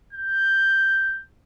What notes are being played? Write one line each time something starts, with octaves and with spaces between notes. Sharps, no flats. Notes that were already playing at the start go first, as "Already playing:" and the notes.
G6